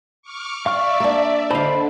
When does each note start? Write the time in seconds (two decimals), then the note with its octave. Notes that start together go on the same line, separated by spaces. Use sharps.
0.22 C#6 D6 F6
0.66 D5 E5 F5 C#6 F6
1.00 A#3 D4
1.50 D3 C5 D#5 F5 A5 B5